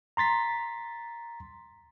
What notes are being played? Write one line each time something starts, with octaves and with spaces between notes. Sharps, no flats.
A#5 C6 A6 B6